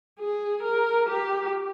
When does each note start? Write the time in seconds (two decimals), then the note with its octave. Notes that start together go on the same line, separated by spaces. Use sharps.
0.20 G#4
0.63 A#4
1.09 G4